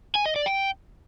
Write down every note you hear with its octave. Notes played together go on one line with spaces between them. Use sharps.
G#5
D#5
D5
G5